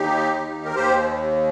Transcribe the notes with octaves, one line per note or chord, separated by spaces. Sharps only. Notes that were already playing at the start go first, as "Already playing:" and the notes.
Already playing: D#2 D#4 G4
D#2
A#4
D#2 G4 C5